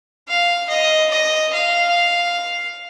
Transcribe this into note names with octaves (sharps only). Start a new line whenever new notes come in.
F5
D#5
D#5
F5